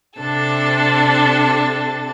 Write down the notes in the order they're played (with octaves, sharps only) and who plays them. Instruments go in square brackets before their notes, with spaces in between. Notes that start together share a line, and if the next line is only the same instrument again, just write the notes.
[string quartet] C3 D4 A4 A6